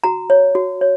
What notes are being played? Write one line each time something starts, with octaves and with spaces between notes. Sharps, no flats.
F#4 A#5
C#5
F#4
C#5